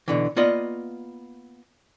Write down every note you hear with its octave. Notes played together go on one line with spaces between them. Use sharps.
B2 D3 E3
A#3 B3 F4 D5 D#5